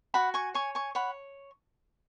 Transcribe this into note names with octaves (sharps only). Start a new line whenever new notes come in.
F#4 F#5 B5
G#5 C#6
C#5 G#5 C#6
G#5 C#6
C#5 F#5 B5